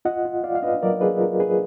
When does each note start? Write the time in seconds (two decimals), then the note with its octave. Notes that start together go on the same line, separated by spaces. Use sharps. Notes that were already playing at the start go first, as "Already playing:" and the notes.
0.05 F4 D#5 F#5
0.25 F4
0.44 F4 D5 F5
0.55 F5
0.62 D4 B4 D#5
0.82 F#3 A#4 D5
1.01 D4 G#4 B4
1.20 F4 A#4
1.40 D4 G#4 B4